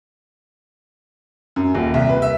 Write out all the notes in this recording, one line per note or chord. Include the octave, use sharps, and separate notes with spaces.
F#2
D#1
C2
B4
E5